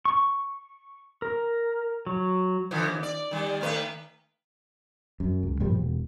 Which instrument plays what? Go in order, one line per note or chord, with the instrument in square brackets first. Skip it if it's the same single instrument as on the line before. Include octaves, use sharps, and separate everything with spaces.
[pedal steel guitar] C#6
A#4
F#3
[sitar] D3 E3 F3
D#2
D5
D#3 G3
D#3 A3 B4
[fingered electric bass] F#2
C#2
G2 A#2 F3 G3
E1